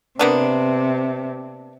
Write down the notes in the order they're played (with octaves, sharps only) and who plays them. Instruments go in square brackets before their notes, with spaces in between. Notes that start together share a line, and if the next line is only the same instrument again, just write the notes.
[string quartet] C3 [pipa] A#3 B3 D4